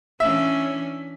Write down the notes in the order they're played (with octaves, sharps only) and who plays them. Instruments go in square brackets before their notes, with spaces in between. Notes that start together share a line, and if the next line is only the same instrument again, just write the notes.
[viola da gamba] E3 C#4 D4 [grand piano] E5